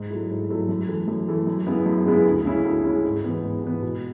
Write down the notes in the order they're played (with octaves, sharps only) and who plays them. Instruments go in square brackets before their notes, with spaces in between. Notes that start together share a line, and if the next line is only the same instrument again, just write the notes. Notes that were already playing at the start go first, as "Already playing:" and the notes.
Already playing: [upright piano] G#2
F#3 A3 E4
G#2
F#3 A3 E4
F#2
E3 A3
F#2
E3 A3
F#2
C#3 G#3 B3 E4
F#2
C#3 G#3 B3 E4
D2
C#3 G#3 C#4 E4
D2
C#3 G#3 C#4 E4
G#2
E3 B3
G#2
E3 B3
B2